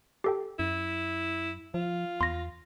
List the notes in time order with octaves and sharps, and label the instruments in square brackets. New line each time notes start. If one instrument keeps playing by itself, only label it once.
[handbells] G4 A4 G5
[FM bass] F#2 [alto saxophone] E4
[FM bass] F3 [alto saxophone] F4
[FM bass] E2 [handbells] C6 A#6